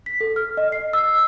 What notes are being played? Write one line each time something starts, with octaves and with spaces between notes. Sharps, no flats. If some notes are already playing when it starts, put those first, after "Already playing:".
B6
A4
F6
D#5
C7
E6